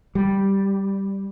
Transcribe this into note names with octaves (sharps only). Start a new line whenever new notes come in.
G3